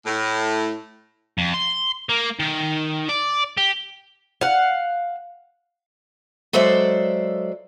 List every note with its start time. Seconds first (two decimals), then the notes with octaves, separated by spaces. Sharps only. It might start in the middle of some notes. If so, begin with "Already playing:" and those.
0.06 A2
1.38 F2
1.54 C6
2.09 A#3
2.40 D#3
3.09 D5
3.58 G4
4.41 F5 F#5
6.53 F#3 G#3 A4 C5 D5 E5